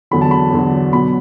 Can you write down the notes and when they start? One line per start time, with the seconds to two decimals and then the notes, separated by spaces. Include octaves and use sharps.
0.11 E2 D3 F#3 B5
0.21 A5
0.31 B5
0.52 E2 D3 F#3
0.93 B2 F#3 B5